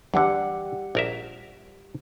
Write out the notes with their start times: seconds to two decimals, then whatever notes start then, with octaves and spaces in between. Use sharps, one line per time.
0.14 E2 D3 G3 G4 F#5
0.95 A#1 A#4 E5